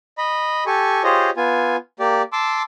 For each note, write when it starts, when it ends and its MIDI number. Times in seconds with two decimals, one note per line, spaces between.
0.18 0.64 75
0.18 0.64 83
0.66 1.03 67
0.66 1.03 69
0.66 1.03 80
0.66 1.03 85
1.04 1.30 65
1.04 1.30 67
1.04 1.30 68
1.04 1.30 72
1.04 1.30 73
1.04 1.30 75
1.37 1.76 59
1.37 1.76 65
1.37 1.76 80
2.00 2.22 58
2.00 2.22 67
2.00 2.22 74
2.33 2.62 81
2.33 2.62 84
2.33 2.62 86
2.33 2.62 88